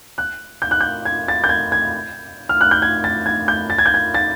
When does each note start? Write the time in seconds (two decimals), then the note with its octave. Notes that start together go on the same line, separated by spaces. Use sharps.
0.18 F#6
0.62 G6
0.71 F#6
0.81 G6
1.05 G#6
1.28 A6
1.44 G6
1.49 G#6
1.72 G#6
2.49 F6
2.61 F#6
2.71 G6
2.82 G#6
3.04 A6
3.26 G#6
3.48 G6
3.70 A6
3.78 G#6
3.86 G6
3.94 G#6
4.14 A6